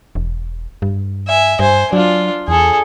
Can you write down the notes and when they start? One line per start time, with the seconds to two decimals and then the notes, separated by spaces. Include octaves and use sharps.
0.15 E1
0.82 G2
1.28 E5 G#5
1.59 G2 C5 G#5
1.93 F#3 D4 F4
2.48 E2 G#4 A4